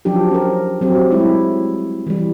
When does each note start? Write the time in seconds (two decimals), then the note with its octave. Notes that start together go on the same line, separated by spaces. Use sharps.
0.05 F3 F#3 D4 G4
0.31 C#4 A#4
0.81 F#3 C4 G4
1.11 G3 G#3 E4
2.07 E3 G3